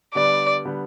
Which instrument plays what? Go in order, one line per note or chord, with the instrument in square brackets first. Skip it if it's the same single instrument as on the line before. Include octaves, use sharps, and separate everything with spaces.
[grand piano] D3 G3 B3 [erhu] D5
[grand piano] D3 G3 B3